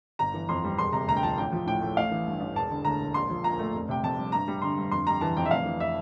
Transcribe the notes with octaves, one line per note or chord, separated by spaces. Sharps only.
G1 A#5
E3
F2 C6
G3
E1 C6
C3 A#5
D2 A#5
G5
F3 A5
A1 G5
F3
A2 G5
A3
A1 F5
E3
G2
A1
E1 A5
D3
D2 A#5
E1
A#1 C6
F3
A#2 A#5
A3
F1
C3 G5
F2 A5
G3
G2 A#5
G3
D3 C6
G2
F2 C6
G3 A#5
E3 A5
F2 G5
E5
F1 F5
E3
E5